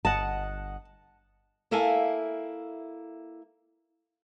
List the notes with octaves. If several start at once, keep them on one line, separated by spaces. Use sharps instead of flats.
G1 D#5 F#5 A5
A#3 E4 A4 E5 F5 G#5